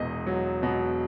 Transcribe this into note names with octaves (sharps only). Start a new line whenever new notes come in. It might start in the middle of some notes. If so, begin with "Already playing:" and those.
Already playing: E1 E2 B2 D#5
F#3
B2